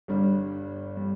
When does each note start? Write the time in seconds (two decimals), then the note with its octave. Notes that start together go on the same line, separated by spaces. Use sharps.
0.08 G1 G2 G3
0.97 G3